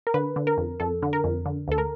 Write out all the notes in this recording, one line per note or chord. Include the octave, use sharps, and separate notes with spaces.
A#4
D3 B4
D3
A#4
F2
F2 A4
D3
A#4
F2
D3
D2 A4
A#4